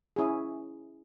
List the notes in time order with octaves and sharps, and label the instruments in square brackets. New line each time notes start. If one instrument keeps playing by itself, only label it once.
[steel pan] C#4 E4 G#4